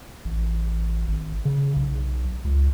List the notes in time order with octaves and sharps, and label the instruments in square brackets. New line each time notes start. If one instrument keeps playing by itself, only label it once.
[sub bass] A1
G#1
C#3
B1
C#2